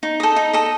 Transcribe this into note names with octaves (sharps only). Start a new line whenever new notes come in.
D#4
A4 D#5
D#4
A4 D#5